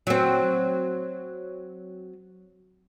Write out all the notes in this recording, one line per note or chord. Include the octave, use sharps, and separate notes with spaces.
F#3 C4